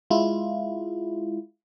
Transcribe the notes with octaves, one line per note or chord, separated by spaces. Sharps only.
G#3 E4 F4